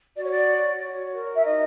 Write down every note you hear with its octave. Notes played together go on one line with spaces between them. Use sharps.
F#4 D5
C#5
D5
C#5
F#4
A#4
E5
D#4 D#5